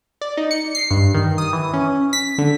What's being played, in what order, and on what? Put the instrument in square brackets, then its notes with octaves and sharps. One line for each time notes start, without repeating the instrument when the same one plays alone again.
[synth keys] D5
D#4
C#7
C7
G2
D#3
D#6
E3
C#4
B6
D3